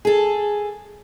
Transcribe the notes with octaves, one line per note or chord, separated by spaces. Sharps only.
G#4 A4